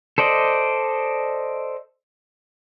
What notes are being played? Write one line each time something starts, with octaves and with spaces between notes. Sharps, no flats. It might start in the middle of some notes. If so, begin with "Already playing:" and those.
A4 C5 D5 D#5